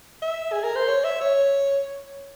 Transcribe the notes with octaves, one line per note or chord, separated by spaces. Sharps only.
E5
G#4
A#4
C5
C#5
E5
C#5